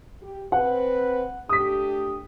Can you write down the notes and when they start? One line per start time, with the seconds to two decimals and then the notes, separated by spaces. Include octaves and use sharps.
0.21 G4
0.52 C4 B4 F#5
1.49 A3 D4 G4 D#6 B6